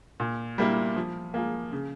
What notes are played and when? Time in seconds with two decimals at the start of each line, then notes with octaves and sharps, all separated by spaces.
0.20 A#2
0.58 G3 A#3 E4
0.96 F3
1.34 A#3 F4 G#4
1.72 C#3